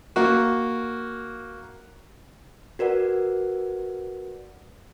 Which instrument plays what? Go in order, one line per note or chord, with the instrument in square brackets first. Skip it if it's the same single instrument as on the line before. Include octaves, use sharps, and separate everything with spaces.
[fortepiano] A#3 F#4
[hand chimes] F#4 A#4 B4 D5 F#5